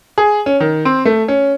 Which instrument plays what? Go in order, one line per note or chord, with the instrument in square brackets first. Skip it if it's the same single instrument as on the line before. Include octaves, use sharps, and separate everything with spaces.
[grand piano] G#4
C#4
D#3
C4
A3
C#4